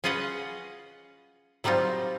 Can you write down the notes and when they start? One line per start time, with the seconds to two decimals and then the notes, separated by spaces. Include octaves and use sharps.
0.04 C#4 F4 G#4 B4 D#5 F#5
1.64 F#3 G3 C4 D#4 F4